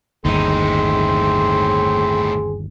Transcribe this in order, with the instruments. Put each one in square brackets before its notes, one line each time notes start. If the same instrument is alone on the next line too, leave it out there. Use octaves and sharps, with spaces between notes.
[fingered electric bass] G1 D#2 [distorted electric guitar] A2 D#4 [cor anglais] C4 [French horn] G#4